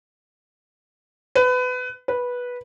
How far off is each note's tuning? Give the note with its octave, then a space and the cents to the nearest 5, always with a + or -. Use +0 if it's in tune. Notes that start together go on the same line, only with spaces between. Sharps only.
B4 +25
B4 -10